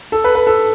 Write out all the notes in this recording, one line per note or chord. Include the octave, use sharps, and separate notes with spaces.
A4
B4
B4
A4